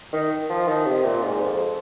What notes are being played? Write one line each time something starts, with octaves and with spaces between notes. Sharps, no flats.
D#3
F3
D#3
C3
A#2
G#2
F2